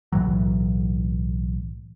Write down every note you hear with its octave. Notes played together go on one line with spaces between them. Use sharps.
B1 A2 E3 F#3